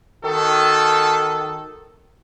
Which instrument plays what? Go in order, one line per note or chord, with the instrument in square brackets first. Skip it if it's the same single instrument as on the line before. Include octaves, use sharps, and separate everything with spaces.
[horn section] D#3 F#4 A4